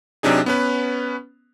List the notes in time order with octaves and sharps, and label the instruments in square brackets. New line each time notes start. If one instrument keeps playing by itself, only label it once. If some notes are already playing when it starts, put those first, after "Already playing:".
[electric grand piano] C3 F#3 D4 D#4 G#4
B3 C#4 B4